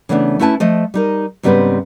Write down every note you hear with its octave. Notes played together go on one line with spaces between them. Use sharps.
C#3 E3 A3 B3 C4 D4
A3 C#4 E4 B4 G#5 A5
F3 A3 D#5
G3 D#4 A#4
G#2 C#3 G3 B3 C4 B4